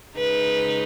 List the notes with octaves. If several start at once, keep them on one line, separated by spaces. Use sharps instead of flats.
C#3 G#3 D#4 B4